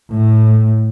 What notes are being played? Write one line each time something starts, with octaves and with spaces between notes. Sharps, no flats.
A2